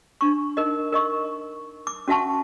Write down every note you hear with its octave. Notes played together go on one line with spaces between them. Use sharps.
D4 C#6
D#4 A#4 D#5
A#4 D#5 C#6
D6
C#4 F#4 E5 F#5 A5 C#6